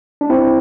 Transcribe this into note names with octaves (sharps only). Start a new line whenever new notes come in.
D4
C4 E4